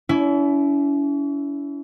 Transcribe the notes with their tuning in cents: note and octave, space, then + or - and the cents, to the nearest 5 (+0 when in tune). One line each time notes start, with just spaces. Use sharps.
C#4 +45 E4 +5